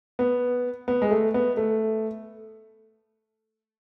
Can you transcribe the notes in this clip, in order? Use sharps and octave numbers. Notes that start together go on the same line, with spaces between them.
B3
B3
G#3
A3
B3
A3